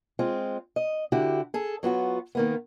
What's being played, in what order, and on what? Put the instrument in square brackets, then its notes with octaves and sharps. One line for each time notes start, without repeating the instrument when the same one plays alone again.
[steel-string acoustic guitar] G#3 C4 F4
D#5
D3 E4 F#4 G4
G#4 A4
F#3 B3 F4 F#4
D#3 A#3 B3